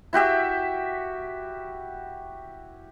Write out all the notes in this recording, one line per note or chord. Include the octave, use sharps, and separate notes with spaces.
E4 F#4 G4 E5